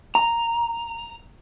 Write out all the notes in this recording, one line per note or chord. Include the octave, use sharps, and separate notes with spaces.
A#5